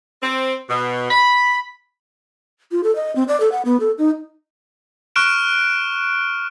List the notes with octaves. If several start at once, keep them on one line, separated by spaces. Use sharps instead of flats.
C4
B2
B5
F4
A4
D#5
C4
D5
A4
F#5
B3
A4
D#4
C#6 F6 F#6 D7 E7